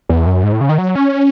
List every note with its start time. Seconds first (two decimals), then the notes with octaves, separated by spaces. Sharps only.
0.09 E2
0.26 F#2
0.43 G#2
0.52 A2
0.61 C#3
0.69 D#3
0.78 F#3
0.95 C#4